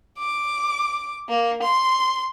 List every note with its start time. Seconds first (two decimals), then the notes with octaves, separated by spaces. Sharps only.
0.19 D6
1.29 A#3
1.63 C6